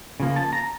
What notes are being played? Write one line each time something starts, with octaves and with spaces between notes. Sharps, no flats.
C#3 F3 A#3
A5
A#5